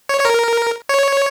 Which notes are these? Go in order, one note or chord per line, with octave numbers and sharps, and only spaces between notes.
C#5
C#5
A#4
C#5